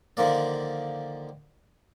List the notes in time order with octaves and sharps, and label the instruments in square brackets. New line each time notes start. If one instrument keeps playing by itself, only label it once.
[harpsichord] D3 D#3 F3 A#3 D5